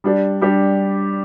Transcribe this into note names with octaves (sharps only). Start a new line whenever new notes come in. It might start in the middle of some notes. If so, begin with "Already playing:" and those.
G3 D4 G4
G3 D4 G4